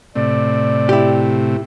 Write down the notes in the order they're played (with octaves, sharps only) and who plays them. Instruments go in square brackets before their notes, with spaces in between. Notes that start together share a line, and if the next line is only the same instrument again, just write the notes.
[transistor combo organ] A2 C3 [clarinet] D5
[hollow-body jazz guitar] E4 G4